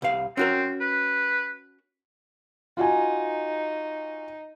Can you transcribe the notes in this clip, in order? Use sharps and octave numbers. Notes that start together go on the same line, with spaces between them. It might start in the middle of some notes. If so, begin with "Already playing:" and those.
C2 F5
C4 C#4 F#4 A#4
B4
D#4 F4 F#4 G#5